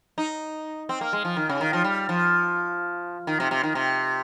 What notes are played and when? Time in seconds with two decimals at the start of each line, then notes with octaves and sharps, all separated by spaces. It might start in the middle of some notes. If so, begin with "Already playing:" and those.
0.18 D#4
0.89 C4
1.01 A#3
1.13 G#3
1.25 F3
1.37 D#3
1.49 C#3
1.61 D#3
1.73 F3
1.84 G3
2.09 F3
3.27 D#3
3.40 C3
3.51 C3
3.63 D#3
3.75 C3